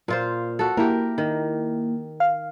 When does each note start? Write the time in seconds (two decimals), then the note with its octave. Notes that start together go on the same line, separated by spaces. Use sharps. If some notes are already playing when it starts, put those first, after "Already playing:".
0.08 A#2 F4 C5
0.59 F#4 A4
0.77 A#3 E4 G4 A#4
1.18 D#3
2.20 F5